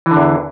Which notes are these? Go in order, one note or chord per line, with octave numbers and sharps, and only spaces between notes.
E2 D3 E3